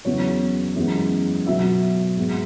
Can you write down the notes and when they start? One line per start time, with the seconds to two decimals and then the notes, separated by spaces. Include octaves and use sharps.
0.05 E2 C#3 F#3 B3 C#5
0.76 F#2 E3 G#3 B3
1.47 B2 F#3 B3 E5
2.17 G#2 G#3 B3